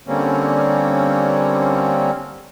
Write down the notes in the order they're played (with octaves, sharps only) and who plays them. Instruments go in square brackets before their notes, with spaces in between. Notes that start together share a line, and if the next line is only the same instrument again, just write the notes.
[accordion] D3 G3 A#3 C4 C#4